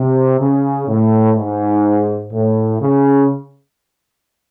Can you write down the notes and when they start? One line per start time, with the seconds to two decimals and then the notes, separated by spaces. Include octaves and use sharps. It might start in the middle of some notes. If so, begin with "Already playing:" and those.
Already playing: C3
0.39 C#3
0.87 A2
1.36 G#2
2.32 A2
2.80 C#3